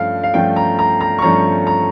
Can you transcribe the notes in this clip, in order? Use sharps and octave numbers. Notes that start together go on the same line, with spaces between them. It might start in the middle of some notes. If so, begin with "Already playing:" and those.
Already playing: G2 F3 A3 C#4 F5
F5
G2 F3 A3 C#4 G5
A#5
A#5
A#5
C#6
G2 F3 A3 C#4 A#5
A#5